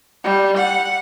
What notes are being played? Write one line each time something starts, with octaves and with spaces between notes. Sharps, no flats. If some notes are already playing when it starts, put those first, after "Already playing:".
G3
F#5